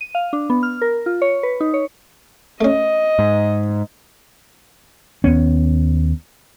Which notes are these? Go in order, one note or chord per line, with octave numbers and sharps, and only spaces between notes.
D#7
F5
D4
B3
F6
A#4
F4
C#5
B4
D#4
C#5
A3 C#4 D#5
G#2
D#2 B3 C#4